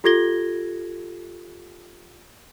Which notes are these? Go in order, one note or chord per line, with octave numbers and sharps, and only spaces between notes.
F4 G4 A4 G#6 A#6 G7